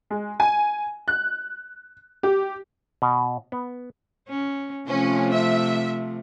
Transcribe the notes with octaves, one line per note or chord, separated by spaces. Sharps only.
G#3
G#5
F#6
G4
B2
B3
C#4
C3 F3 A3 C#4
E5